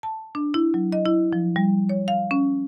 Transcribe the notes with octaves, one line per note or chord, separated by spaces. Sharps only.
A5
D4
E4
F#3
D#5
E4
F3
G3
C#5
F5
C#4